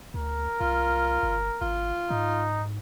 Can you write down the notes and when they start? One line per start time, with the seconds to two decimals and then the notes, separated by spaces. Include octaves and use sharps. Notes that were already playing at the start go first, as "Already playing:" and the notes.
0.14 D2 A#4
0.61 C2 F4
1.23 G1
1.61 G#1 F4
2.10 G#2 D#4